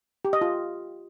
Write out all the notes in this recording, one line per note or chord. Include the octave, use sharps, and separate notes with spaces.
G4
D#5
F4